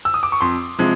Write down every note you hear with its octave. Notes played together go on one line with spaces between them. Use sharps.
E6
D#6
D6
C#6
F2 C6
C3 F3 G#3